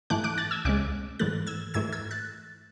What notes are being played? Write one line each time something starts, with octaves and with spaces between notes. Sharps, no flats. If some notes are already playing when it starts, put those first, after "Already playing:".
G#2 E3 A3 D6 F#6
D6 F#6
F#6 A6
E6 G#6
C#2 C#3 G#3 D6 F#6
G#2 E3 A3 F#6 A6
E6 G#6
G#2 E3 A3 E6 G#6
E6 G#6
F#6 A6